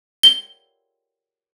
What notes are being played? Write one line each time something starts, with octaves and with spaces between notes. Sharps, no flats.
G7